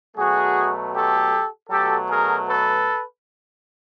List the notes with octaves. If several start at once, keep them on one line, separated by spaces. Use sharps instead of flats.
B2 F#3 A3 F#4 G#4
G4 A4
B2 F#3 A3 G4 A4
G#4 A#4
A4 B4